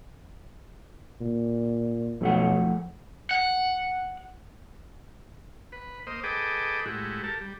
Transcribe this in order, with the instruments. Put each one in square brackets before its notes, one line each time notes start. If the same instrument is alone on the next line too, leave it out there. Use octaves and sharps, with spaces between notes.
[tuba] A#2
[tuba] B1 [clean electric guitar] F2 A3 F#5
[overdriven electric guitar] F#5
[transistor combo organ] B4
A#3 C5 D#5
G#4 A4 B4 D#5 G5 D6
A2 G#3 E4 F#4 G4
G4 A4 A#4 A5
G3